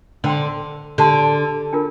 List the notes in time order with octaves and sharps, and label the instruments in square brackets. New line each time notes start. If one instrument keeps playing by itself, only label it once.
[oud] D3 [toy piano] C5 G5 C6
[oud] D3 [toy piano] G4 D5 A5 C6
[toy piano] D4 F4 A#4